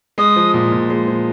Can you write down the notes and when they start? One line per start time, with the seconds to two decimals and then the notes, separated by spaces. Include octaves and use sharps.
0.18 G#3 D#6
0.36 F3
0.54 A#2
0.72 A#2
0.90 G#3
1.08 F3